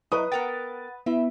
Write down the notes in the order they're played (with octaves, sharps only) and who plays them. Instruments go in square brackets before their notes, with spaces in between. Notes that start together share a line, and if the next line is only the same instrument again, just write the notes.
[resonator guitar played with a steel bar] F#3 [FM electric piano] E4 D#5 [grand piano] B4 D#6
[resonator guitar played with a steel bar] B3 A#4 G5 [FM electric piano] F#5 A6
[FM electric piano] B3 E4 B5 [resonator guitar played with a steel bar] E5